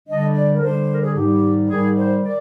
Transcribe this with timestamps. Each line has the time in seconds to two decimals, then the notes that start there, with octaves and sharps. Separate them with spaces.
0.08 D3 G3 D4 D#5
0.35 D5
0.56 A#4
0.62 D3 G3 D4 C5
0.91 A#4
1.03 G#4
1.16 G#2 D#3 G3 G4
1.70 G#2 D#3 G3 G#4
1.97 C5
2.24 D#3 D5